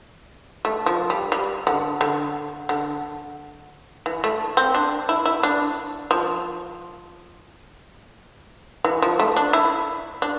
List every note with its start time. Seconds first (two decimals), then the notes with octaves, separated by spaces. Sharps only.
0.65 A3
0.86 F3
1.10 G3
1.32 G3
1.67 D3
2.01 D3
2.69 D3
4.06 E3
4.24 A3
4.57 C4
4.75 D4
5.09 E4
5.26 E4
5.43 D4
6.11 F3
8.84 E3
9.02 F3
9.19 A3
9.36 D4
9.53 E4
10.22 D4